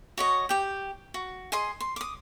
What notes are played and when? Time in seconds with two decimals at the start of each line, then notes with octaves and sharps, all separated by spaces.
0.18 F#4 C#5 D#5
0.49 G4 G5
1.14 F#4
1.52 G#4 D#5 C6
1.81 C6
1.96 D6 D#6